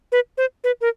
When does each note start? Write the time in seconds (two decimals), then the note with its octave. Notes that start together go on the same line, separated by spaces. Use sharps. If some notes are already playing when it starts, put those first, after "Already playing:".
0.12 B4
0.38 C5
0.64 B4
0.81 A#4